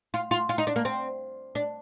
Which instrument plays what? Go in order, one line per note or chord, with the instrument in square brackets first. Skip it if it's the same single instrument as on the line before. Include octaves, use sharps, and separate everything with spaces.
[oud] F4
F4
F4
D#4
D4
A#3
C4
D4